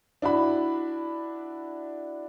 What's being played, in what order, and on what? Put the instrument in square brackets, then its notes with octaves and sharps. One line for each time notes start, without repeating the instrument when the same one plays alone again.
[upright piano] D4 E4 F#4 B5